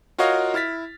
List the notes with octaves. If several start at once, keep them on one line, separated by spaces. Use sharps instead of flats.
F4 F#4 A#4 C#5 D#5 F5
E4 F6 A6 B6